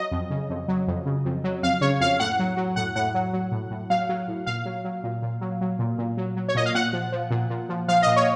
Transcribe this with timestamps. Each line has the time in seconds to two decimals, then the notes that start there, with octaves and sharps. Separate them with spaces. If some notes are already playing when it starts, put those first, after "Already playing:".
Already playing: F#3 D#5
0.11 F2
0.30 C#3
0.50 F2
0.68 F#3
0.88 F2
1.06 C#3
1.25 F2
1.44 F#3
1.63 F2 F5
1.81 C#3 C#5
2.00 F2 F5
2.20 A2 F#5
2.39 F#3
2.57 F#3
2.76 A2 F#5
2.96 A2 F#5
3.14 F#3
3.33 F#3
3.52 A2
3.71 A2
3.90 F#3 F5
4.09 F#3
4.28 A2
4.46 A#2 F5
4.65 F#3
4.84 F#3
5.03 A#2
5.22 A#2
5.41 F#3
5.61 F#3
5.79 A#2
5.98 A#2
6.17 F#3
6.36 F#3
6.48 C#5
6.55 A#2 D#5
6.66 F5
6.75 A#2 F#5
6.93 F3
7.12 F3
7.31 A#2
7.50 A#2
7.69 F3
7.88 F3 F5
8.02 A#2 D#5
8.16 C#5